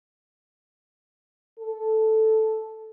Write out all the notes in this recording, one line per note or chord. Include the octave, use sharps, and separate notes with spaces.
A4